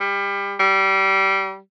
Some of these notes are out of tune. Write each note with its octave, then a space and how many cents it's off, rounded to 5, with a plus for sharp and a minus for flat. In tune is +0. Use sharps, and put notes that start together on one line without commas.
G3 +25
G3 -20